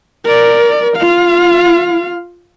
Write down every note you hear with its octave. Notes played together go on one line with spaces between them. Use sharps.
A#4 D5
F4 F5